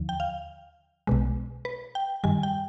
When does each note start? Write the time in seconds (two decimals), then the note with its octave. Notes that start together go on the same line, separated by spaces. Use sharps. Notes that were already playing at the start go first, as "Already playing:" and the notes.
Already playing: D#2 D3 F3
0.09 G5
0.20 F5
1.07 B1 B2 G#3
1.65 B4
1.95 G5
2.24 G2 D#3 G3 G#5
2.43 G5